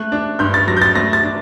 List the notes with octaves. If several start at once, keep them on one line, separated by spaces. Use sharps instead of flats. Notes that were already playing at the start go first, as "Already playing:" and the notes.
Already playing: A3 F#6
D4
G2 G6
A6
F#3 A#6
G6
A6
A3 A#6
A6
D4